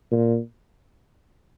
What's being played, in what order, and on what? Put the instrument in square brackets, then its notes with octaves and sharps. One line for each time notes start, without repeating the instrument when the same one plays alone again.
[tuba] A#2